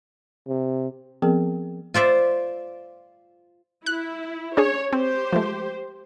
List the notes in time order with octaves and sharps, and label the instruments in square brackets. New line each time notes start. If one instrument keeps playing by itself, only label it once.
[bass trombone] C3
[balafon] F3 B3 C4 G#4 A#4 G5
[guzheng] F4 C5 D5 E5
[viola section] E4 [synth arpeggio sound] F#6
[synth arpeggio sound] C#4 D4 G#4 [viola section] C#5
[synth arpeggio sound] C4 [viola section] G4 C5
[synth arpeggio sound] F3 G#3 A3